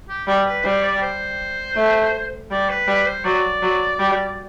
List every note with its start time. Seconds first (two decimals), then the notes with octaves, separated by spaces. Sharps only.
0.09 G4
0.27 G3
0.46 B4
0.64 G3 C5
0.83 D5
1.02 C5
1.76 A3
2.51 G3 D5
2.69 B4
2.88 G3 B4
3.06 C5
3.25 F#3 D5
3.62 F#3
4.00 G3